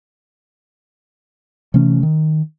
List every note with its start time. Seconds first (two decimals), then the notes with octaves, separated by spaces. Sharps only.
1.74 C3 E3 A3 C#4
2.03 D#3